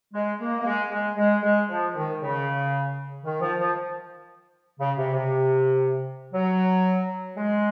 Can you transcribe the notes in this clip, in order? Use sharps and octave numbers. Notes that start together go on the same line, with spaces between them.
G#3
A#3
A#3
G#3
G#3
G#3
G#3
F3
D#3
C#3
D#3
F3
F3
C#3
C3
C3
F#3
G#3